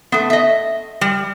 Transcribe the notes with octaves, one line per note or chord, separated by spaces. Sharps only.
A3 B3
D#5 E5
G3